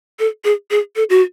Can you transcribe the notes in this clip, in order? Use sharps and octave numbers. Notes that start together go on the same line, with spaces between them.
A4
G#4
G#4
A4
F#4